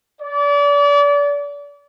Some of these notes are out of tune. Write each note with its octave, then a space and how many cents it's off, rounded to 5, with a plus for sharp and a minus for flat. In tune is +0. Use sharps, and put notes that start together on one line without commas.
D5 -35